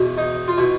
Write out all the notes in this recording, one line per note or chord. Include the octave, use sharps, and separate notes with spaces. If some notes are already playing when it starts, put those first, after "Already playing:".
Already playing: E2 B2
D#4
F4
B2 E4